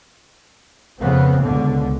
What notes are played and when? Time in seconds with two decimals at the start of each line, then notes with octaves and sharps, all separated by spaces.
1.00 F2 C#3 B3 C4
1.43 C#2 B2 D3